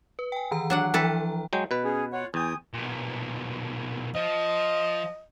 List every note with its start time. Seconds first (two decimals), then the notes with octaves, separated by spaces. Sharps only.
0.19 B4
0.32 G5 G#5
0.51 D#3 E3 A#5
0.70 F#3 D4 F#5
0.94 E3 F3 A4 B4 G5 A#5
1.53 F#3 G#3 G5
1.71 B2 B4
1.84 C#4 G#4
2.12 F4 C#5 F#5
2.34 E2 G5 G#5 D#6
2.74 B1 A#2
4.15 F3 D#5